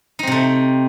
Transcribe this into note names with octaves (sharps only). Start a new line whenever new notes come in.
C3 A3 C4 D#4